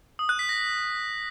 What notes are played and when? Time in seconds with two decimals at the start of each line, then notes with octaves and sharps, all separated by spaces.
0.19 D#6
0.29 F#6
0.39 B6
0.49 A#6